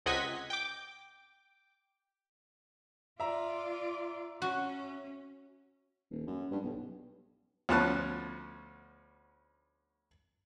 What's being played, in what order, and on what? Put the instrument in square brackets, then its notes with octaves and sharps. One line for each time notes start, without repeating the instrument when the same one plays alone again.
[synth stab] C#2 C3 D#5 F#5 G#6 B6
G5 D6
[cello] F4 D5 [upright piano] E5 A#5
[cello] C#4 [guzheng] F#4
[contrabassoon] D#1
F#2
G2
B1
[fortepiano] D2 F3 B3 C#4 A5 F#6